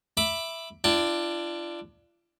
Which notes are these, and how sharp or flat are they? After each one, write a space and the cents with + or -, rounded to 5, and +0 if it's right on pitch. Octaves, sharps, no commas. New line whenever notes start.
E5 +0 B5 +0 D6 +10
D4 +10 F4 -40 G5 +0